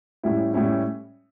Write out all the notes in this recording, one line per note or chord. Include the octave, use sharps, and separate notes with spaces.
A2 G3 C#4 E4
A2 G3 C#4 E4